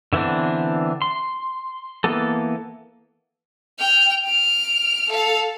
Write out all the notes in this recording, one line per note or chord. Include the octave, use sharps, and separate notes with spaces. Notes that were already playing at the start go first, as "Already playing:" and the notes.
D3 E3 B3 C4 D4
C6
E3 A#3 B3 A4
G5 F6
F6 D7
A4 F5